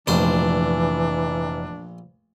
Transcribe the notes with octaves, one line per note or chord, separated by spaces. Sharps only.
F1 A#1 E3 D4 C5